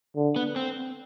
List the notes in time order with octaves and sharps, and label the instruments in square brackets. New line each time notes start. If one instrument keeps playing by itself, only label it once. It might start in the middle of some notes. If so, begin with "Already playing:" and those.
[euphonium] D3
[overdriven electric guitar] B3
C4